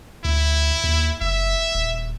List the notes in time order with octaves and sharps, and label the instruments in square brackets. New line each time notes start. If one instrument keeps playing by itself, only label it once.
[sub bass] D2 [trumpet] E4
[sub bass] D#2
[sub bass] F#1 [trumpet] E5
[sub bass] D#1